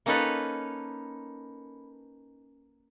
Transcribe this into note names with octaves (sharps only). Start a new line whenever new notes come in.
A#3 C#4 D#4 A4 B4 C#5